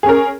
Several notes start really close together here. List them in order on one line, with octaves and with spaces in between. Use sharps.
G#4 C#4 A#4